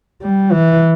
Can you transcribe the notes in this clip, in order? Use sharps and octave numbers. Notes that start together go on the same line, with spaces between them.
G3
E3